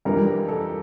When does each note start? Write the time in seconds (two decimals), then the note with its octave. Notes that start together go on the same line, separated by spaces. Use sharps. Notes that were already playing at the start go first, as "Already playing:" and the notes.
0.05 F2 E3 G3 D4 A#4
0.48 A4